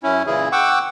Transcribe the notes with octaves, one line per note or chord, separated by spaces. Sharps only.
F#2 C#4 E4
A#2 C#3 E3 E4 G#4
F#5 G5 C#6 D6 E6